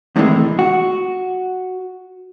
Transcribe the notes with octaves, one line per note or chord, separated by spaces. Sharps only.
E2 A2 C3 D#3 E3 G#3
F#4